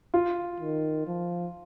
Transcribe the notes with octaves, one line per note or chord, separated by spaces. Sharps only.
F4
D#3
F3